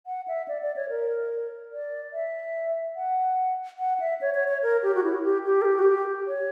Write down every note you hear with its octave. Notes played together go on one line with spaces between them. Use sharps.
F#5
E5
D5
D5
C#5
A#4
D5
E5
F#5
F#5
E5
C#5
C#5
C#5
A#4
G4
F#4
E4
G4
G4
A#4
G4
F#4
G4
C#5